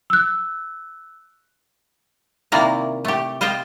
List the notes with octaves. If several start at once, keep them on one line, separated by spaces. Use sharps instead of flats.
E6 F#6
C3 D#3 A#3 E4 D5 A#5
A3 G4
F4 C5 D#5 F5 G5